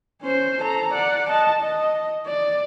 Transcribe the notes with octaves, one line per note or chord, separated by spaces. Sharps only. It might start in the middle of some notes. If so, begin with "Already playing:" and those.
C#4 C5
A4 A#5
D5 F#5
D#5 A5
D#5
D5